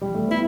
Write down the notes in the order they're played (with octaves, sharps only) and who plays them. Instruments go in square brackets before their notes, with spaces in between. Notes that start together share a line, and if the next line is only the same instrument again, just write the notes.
[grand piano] G3
A3
[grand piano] B3 [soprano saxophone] E4